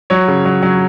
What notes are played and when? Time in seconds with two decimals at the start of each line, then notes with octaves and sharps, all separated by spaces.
0.10 F#3 C#5
0.28 C#3
0.45 F#3
0.63 F#3